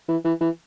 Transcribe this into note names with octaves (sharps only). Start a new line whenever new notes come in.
E3
E3
E3